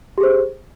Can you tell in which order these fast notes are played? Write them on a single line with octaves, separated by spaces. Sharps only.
G4 G#4 C5